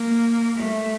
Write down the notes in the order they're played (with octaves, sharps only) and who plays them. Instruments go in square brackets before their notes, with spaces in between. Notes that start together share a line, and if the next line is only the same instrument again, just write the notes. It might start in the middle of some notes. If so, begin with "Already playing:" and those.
Already playing: [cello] A#3
A3